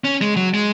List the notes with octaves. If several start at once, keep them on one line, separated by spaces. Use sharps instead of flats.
C#4
G#3
F#3
G#3